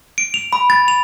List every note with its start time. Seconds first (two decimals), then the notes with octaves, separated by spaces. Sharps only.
0.18 D7
0.34 F7
0.53 B5
0.70 A6
0.88 F7